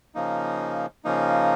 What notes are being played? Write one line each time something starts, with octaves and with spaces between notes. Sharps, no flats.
C#3 F3 A#3 D#4
C#3 F3 A#3 D#4